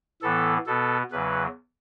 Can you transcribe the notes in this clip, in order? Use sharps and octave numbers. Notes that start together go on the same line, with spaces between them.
A2 E3 B3 A4
B2 B3 A4
E2 C#3 F#3 B4